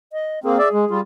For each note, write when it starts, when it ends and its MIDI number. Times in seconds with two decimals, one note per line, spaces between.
0.13 0.40 75
0.44 0.58 58
0.44 0.58 60
0.44 1.00 68
0.58 0.69 74
0.58 0.69 76
0.73 0.85 56
0.91 1.01 55
0.91 1.01 65